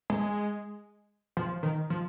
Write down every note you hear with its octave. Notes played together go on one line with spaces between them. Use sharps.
G#3
F3
D#3
F3